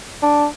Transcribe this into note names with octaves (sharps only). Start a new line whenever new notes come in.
D4